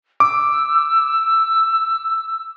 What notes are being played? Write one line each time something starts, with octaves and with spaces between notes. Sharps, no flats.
D6 E6